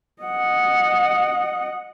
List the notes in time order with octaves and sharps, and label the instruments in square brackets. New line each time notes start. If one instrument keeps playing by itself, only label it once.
[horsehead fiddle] D#5 F#5